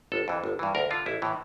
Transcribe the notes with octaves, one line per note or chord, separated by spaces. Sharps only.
G1 A4
F2 E3
G1
G2 E3
D2 A#4
D3 F4
A1 E4
A2 E3